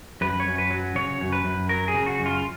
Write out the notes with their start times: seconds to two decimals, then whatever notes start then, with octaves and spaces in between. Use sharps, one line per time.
0.21 F#2 B4
0.40 C#5
0.46 F#2
0.58 B4
0.70 F#3
0.95 C#3 C#5
1.20 F#2
1.32 B4
1.45 F#2
1.69 F#3 A#4
1.88 G#4
1.95 C#3
2.06 F#4
2.19 F#2
2.26 F4